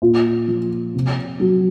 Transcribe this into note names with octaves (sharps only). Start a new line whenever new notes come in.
A#2 F4
F3
C3
F#3